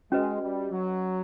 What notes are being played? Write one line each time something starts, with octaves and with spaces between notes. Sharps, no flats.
G#3 C#4 F#4 B4 D#5
G3
F#3